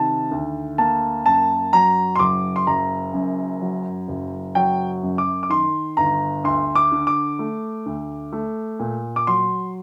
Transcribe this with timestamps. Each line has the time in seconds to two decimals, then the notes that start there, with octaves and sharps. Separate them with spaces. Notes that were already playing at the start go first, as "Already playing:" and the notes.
Already playing: C3 D#3 A5
0.31 D2
0.78 A#3 A5
1.26 F#2 A5
1.73 F#3 A#5
2.16 C6
2.19 F#1 D6
2.56 C6
2.67 F#1 A#5
3.14 F#2
3.61 F#3
4.08 F#1
4.55 F#3 G5
5.03 F#2
5.18 D6
5.43 D6
5.49 D#3 C6
5.97 G1 A#5
6.44 D2 C6
6.75 D6
6.92 D3
7.07 D6
7.39 A3
7.86 D2
8.32 A3
8.80 A#2
9.16 D6
9.27 F#3 C6